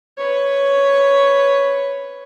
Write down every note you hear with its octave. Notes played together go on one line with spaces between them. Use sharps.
B4 C#5